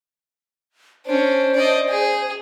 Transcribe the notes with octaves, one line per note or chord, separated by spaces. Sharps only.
C#4 D4 C5
D5 D#5
G#4